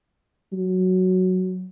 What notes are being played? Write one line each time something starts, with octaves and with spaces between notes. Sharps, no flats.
F#3